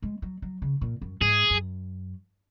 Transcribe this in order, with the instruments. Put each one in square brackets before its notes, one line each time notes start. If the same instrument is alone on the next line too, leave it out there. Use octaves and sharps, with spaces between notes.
[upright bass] G#3
F#3
F#3
C#3
A#2
F#2
[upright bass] G#2 [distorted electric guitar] G#4
[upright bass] F#2